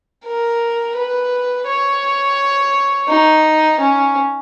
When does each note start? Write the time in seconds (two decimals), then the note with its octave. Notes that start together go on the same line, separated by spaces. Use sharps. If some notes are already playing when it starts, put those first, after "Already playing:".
0.25 A#4
0.95 B4
1.67 C#5
3.08 D#4
3.80 C#4